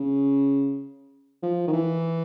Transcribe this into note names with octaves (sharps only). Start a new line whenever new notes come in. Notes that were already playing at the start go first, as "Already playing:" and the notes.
Already playing: C#3
F3
D#3
E3